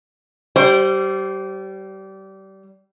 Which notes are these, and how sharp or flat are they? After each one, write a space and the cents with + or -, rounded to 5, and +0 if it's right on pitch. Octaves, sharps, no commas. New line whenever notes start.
G3 -25 C5 +0